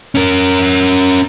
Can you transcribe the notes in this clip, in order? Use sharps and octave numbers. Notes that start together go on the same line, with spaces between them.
C#4 A#4